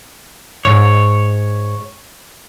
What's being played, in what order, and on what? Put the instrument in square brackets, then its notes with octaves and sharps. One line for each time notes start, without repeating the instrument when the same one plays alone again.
[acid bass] G#2 [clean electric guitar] C#5